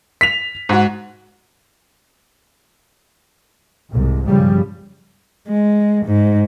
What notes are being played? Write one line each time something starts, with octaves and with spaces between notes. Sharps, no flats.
B6 F7
G#2 F#4
C2 G#2
B1 G2 C#3 F3 G3
G#3
G#2